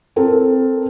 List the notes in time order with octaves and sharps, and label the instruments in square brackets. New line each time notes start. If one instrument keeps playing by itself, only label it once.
[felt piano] C4 A4 A#4